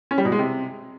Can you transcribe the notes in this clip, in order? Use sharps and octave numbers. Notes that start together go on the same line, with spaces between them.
C#4
G3
B2
G#3
C3